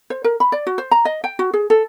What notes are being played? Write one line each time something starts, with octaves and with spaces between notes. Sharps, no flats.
C5
A#4
B5
D5
F#4
C5
A#5
D#5
G5
F#4
G#4
A4